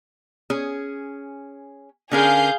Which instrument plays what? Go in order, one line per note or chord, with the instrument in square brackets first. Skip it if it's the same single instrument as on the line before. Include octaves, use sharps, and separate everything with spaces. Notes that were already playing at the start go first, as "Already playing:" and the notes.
[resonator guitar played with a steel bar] C#4 G#4
[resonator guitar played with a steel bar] D3 C#4 A#4 [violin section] G#4 F5 G6